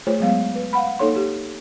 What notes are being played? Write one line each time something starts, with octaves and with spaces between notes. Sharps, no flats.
A3 F4 G#4 C5 C#5
F#3 G#3 B3 F5
B4
F5 F#5 B5
A#3 D#4 A4 C#5 C6
G4